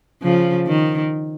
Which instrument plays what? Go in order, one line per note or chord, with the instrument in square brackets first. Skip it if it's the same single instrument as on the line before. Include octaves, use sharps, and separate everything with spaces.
[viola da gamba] C#3 F3
D#3